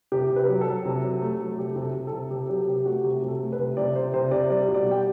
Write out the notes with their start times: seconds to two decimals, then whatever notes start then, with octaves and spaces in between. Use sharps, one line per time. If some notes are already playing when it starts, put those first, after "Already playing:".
0.12 C3 G4
0.30 C3
0.36 B4
0.48 F#3
0.61 A4
0.67 F#3
0.85 C3
1.04 F#3
1.22 A3
1.40 F#3
1.58 C3 G4
1.76 C3
1.82 A4
1.94 C3
2.07 A4
2.12 C3
2.31 C3 G4
2.49 F#3 G4
2.67 C3 G4
2.86 A3 F#4
3.04 C3 G4
3.22 C3
3.28 A4
3.40 A3
3.52 B4
3.59 C3
3.77 C3 D5
3.95 C3 C5
4.14 C3 C5
4.31 C3 D5
4.50 G3 D5
4.68 B2
4.75 D5
4.86 G3 G5